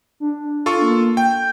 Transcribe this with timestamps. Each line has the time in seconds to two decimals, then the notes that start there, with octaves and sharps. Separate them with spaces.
0.20 D4
0.66 F4 A4 C#6
0.82 A#3
1.17 G5 G6